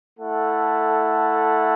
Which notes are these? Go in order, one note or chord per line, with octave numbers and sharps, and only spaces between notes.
A3 E4 A4 F#5